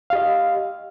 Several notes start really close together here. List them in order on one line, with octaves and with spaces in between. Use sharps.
F5 G4 D#5